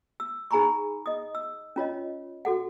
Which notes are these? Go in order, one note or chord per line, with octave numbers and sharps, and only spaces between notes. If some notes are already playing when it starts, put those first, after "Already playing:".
E6
D#4 G#4 G#5 A#5 B5 C#6
D#5 D#6
E6
C#4 F4 C#5 D#5
F#4 A4 F#5